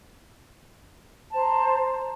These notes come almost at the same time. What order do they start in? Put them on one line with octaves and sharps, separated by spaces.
A5 C5 A#5